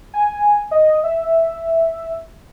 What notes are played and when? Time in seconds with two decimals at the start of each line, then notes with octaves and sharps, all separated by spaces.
0.14 G#5
0.71 D#5
1.04 E5